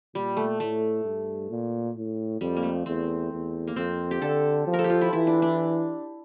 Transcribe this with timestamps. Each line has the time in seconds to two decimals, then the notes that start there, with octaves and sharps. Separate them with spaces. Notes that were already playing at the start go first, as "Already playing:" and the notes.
0.14 A#2 G3
0.37 A3
0.60 A2 A3
1.04 G2
1.50 A#2
1.96 A2
2.41 F2 G3
2.57 A#3
2.63 A3
2.86 E2 C4
3.31 E2
3.68 A#3
3.76 F2 C4
4.11 G4
4.22 D3 A4
4.67 F3
4.74 A#4
4.79 A4
4.84 G4
4.90 F4
5.01 E4
5.13 E3 E4
5.27 D4
5.42 D4